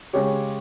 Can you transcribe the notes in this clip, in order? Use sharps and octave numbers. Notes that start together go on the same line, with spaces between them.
C#3 G#3 C#4 G4 C#5